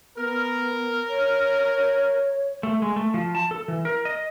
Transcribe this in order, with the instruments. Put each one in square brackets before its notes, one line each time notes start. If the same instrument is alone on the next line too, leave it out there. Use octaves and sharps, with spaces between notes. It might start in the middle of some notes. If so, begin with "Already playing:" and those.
[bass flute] B3 [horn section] A#4
[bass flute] C#5
[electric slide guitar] A3
G#3
A3
F3
A5
A4
E3
A#4
D#5